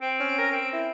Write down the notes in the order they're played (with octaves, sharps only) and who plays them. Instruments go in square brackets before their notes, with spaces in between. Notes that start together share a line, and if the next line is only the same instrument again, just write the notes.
[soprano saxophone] C4 [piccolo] D7
[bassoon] C#4
[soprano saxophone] A#4
C4
[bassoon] E4